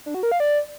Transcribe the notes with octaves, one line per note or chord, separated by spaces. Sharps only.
D4
F#4
A#4
F5
D5